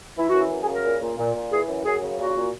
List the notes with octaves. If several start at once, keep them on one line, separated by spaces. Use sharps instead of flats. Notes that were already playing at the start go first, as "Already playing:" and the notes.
E3 E4
F#4
F#2
E4
F#2
G#4
C#3
A#4
A#2
A#2
A#2
A#2
E3 G#4
F#2
F#2 G#4
C#3
A#2 F#4
A#2